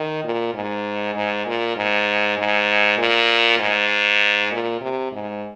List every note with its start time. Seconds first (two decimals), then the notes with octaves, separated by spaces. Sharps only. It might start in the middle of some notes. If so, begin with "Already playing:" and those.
Already playing: D#3
0.24 A#2
0.54 G#2
1.15 G#2
1.47 A#2
1.76 G#2
2.38 G#2
2.98 A#2
3.59 G#2
4.52 A#2
4.81 C3
5.12 G#2